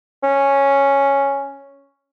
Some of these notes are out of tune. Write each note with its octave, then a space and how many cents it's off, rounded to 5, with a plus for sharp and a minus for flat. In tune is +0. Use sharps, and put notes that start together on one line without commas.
C#4 +0